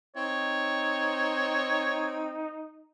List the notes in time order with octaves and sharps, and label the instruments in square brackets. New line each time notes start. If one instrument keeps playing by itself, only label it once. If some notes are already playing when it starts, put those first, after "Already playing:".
[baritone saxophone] C4 [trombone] D#4 [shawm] C#5